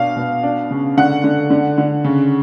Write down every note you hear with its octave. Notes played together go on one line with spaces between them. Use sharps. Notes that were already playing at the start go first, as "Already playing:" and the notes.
Already playing: B2 D4 F5
B2
D4
C#3
D3 F#5
D3
D3
D3
C#3